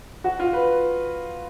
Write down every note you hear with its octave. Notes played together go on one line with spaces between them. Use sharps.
F#4
F4
B4